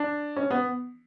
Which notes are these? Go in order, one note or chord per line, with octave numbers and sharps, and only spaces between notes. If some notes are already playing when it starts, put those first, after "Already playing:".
Already playing: D4
C#4
B3